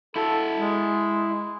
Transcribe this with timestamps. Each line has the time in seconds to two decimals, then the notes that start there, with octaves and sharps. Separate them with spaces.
0.16 E4 F#4 A4
0.56 G#3